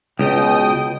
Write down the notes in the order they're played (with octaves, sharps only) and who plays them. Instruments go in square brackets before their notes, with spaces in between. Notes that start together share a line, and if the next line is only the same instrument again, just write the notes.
[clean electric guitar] C#2 [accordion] B2 G5 D#6